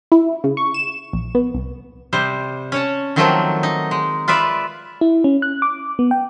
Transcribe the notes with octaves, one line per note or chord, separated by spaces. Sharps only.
E4
C#3
C#6
E7
A#1
B3
C2
C3 G3 C5
C#4 C#5 A5
D#3 F3 F#3 A3 A#3 C4
D#4
G#3
F4 B4 D5 E5
E4
C#4
F#6
D6
B3
G5